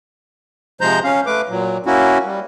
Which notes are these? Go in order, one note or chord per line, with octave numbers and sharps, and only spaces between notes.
C3 F3 G#3 C5 A#5 G6
C#4 F5
A3 B4 D6
A#2 F#3
A#3 C#4 E4 F#4
G3